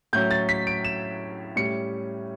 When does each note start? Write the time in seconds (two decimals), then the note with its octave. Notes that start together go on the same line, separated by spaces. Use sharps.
0.13 A2 F#3 C#4 G6
0.31 A6
0.49 B6
0.67 D7
0.85 E7
1.56 A2 G3 C#4 C#7